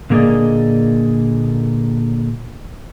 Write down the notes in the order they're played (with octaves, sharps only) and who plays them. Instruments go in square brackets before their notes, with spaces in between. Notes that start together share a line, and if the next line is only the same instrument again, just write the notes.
[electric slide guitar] A#2 D3 A#3 G#4 D5 D#5